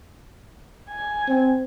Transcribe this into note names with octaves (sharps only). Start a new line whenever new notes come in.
G#5
C4